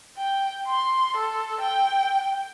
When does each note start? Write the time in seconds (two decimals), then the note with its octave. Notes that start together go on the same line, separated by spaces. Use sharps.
0.17 G5
0.67 C6
1.17 A4
1.60 G5